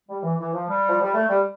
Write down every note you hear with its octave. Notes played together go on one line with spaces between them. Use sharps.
G3
E3
E3
F3
G3
F3
G3
A3
G3